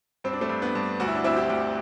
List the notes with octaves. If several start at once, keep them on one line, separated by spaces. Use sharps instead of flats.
G2 C4
D4
A3 C4
G2
B3 D4
G2
D2 F#4
E4
D4
D2 C4 E4
E4 G4
D2